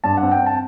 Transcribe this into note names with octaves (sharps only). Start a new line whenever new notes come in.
G2 A5
F#5
C4
G5
C4 A5